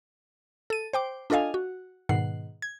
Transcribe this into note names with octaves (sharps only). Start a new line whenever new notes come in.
A4 D#7
C5 G5 D6
D4 F4 A4 D#5 F5 G#5
F#4
G#2 B2 D#3 F#5 C7
G#6